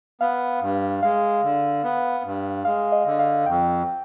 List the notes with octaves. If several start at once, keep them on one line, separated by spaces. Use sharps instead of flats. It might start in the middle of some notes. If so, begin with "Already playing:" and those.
B3 F5
G2
G#3 F5
D3
B3
G2
G#3 F5
D#5
D3
F5
F2 G5